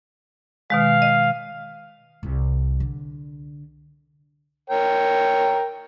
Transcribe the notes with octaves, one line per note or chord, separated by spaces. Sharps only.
B2 D#3 G#3 F5
D#5
C2
D3
A#4 C#5 G5